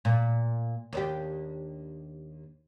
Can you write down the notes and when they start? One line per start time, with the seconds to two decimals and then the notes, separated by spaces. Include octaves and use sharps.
0.05 A#2
0.93 D#2 D4 G4